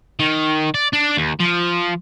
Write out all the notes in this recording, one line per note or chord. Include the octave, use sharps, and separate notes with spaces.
D#3
D5
D4
D#2
F3